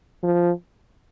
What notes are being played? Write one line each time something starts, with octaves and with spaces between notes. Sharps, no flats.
F3